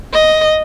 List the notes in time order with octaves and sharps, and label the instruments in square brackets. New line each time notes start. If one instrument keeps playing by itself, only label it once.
[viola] D#5